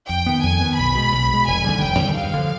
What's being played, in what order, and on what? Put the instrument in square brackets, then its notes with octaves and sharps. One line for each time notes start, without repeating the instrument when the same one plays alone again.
[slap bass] F2 [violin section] G5
[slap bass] D#3 B3
[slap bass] F2 [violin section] G#5
[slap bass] D#3 B3
[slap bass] B1 [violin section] B5
[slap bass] B2 G#3
B1
B2 G#3
[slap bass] F1 [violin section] G#5
[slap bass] D#2 D3 G3
[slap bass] F1 [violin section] G5
[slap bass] D#2 D3 G3
[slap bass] G2 [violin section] F5
[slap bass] D3 F3